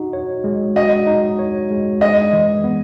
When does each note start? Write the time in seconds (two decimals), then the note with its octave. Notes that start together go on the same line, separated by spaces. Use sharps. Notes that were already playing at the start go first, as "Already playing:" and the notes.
Already playing: D#4 F#4
0.13 C#5
0.44 G#3
0.76 F#4 D#5
1.07 D#4
1.39 C#5
1.71 G#3
2.01 G#3 D#5
2.33 E3
2.64 B3